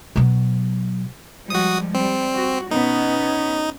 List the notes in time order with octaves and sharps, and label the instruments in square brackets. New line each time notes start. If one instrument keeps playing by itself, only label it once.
[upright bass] B2 F#3
[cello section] F3 G3 G#3 [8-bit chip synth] F#4 D#6
[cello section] G3 [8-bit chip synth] C4
[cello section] F#4
[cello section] B2 B3 C#4 [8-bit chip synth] D#4